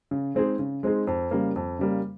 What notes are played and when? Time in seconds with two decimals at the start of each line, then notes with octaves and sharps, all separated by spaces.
0.11 C#3
0.35 G#3 C4 D#4 G#4
0.59 C#3
0.83 G#3 C4 D#4 G#4
1.07 F2
1.31 C#3 G3 A#3
1.56 F2
1.79 C#3 G3 A#3